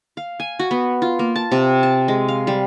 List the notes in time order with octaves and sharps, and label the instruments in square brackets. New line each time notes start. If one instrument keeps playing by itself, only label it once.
[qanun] F5
G#5
F#4
B3
F4
A#3
A5
C3
A5
G#3
F5
G3